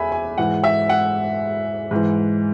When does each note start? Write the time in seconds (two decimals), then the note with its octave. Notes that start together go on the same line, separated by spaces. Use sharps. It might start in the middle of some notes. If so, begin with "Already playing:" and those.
Already playing: E2 E5 G#5 B5
0.12 G#5
0.38 G#2 E3 F#5
0.64 E5
0.89 F#5
1.91 G#2 E3